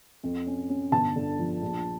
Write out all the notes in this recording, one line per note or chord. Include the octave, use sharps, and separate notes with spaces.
F2
C#4
C#4
G1 A5
D3
F3
A#1